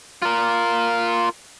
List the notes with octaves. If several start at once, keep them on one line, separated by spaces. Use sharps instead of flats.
F4 A#4